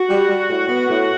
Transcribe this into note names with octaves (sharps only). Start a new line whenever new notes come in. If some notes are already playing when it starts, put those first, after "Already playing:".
Already playing: F#4
G3
G3
A2
B3
A2